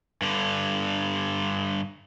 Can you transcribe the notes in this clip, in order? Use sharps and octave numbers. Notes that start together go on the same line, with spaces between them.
G2 D3